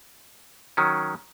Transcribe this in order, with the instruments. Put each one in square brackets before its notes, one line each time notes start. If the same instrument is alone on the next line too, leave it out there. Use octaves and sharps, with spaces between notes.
[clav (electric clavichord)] D#3 F#3 C#4